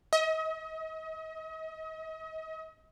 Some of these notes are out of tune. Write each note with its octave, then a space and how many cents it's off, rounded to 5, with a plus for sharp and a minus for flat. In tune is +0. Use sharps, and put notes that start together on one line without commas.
D#5 +40